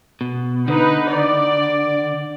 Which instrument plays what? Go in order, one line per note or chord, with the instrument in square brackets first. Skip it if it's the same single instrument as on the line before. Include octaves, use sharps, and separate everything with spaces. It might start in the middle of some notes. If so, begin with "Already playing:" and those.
[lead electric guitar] B2
[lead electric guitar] D3 [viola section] D#4 B4
[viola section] D5